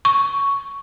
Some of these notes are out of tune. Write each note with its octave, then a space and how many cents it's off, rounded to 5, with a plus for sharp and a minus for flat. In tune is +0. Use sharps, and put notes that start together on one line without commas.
C#6 +5